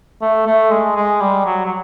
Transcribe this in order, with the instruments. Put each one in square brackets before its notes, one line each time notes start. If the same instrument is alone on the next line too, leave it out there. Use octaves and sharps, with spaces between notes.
[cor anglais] A3
A3
G#3
G#3
G3
F#3
F#3